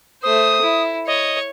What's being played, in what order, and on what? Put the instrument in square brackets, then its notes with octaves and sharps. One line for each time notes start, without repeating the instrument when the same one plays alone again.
[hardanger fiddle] A3 C5 [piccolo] D#6
[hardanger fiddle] E4
[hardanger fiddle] C#5 [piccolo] D#5